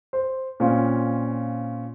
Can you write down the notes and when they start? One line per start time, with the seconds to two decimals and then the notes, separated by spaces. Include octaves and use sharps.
0.13 C5
0.60 A#2 C4 C#4 F4